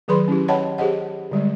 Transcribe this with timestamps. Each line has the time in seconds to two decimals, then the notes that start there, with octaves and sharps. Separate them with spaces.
0.08 D#3 F#3 G#4 B4 B5 C6
0.28 C#4 E4 G4
0.48 C#5 D#5 F#5 G5 A5 B5
0.78 G4 G#4 C5 D#5 F#5
1.31 D3 G3 G#3